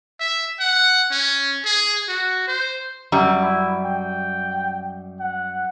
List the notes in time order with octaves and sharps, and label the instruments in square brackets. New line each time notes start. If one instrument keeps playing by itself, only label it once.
[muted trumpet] E5
F#5
C#4
G#4
F#4
C5
[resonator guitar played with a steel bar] F#2 G3
[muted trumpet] E4
G5
F#5